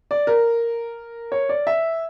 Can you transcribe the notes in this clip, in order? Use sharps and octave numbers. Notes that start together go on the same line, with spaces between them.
D5
A#4
C#5
D5
E5